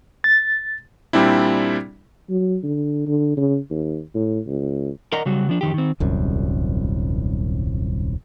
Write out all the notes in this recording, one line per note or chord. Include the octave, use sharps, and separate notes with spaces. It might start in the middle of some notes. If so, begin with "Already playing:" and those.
A6
A#2 G3 C4 D4 E4
F#3
D3
D3
C#3
D#2
A2
C#2
A#4 D5 D#5 F#5 A#5
C#3 F#3 G3 F#4
F3 D4
F2 D#3 G4
D#3 C4
D#1 C2 F#2